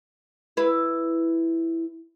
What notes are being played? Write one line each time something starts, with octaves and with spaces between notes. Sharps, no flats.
E4 B4